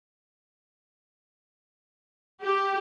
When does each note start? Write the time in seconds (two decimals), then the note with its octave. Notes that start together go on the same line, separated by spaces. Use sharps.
2.43 G4